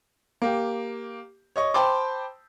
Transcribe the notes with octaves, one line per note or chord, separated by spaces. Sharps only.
A#3 G4
C#5 D#5 C#6
C5 G5 A5 B5 C6 D6